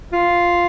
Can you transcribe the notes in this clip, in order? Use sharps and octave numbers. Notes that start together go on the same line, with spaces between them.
F4